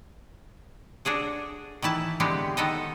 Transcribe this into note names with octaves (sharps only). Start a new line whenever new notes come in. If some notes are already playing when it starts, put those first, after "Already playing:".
D4 F#4 G#4 A4
D#3 E3 E4 A5
D3 G#3 B3 C4 G4
D#3 B3 A4 D#5